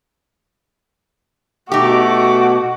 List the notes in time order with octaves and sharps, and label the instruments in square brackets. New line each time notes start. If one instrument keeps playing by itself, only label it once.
[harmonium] B2 [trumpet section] A3 D6 [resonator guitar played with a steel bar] D#4 G4 [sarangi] F#4